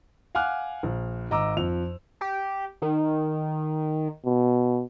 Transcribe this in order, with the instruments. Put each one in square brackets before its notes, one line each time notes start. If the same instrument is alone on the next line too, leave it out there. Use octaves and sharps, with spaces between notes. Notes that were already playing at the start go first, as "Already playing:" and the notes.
[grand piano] F5 F#5 G#5 D6 F6 F#6
A#1
G#1 D#5 A#5 D6 E6
F2 F7
[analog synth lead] G4
D#3
[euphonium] B2